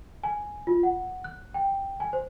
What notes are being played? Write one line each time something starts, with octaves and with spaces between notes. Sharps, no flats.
G#5
F4
F#5
F#6
G5
G#5
C5